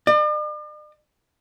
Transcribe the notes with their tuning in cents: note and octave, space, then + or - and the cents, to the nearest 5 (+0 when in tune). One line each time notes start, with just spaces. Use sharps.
D5 +45